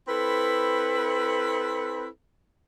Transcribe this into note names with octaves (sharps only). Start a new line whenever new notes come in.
C4 E4 A4 B4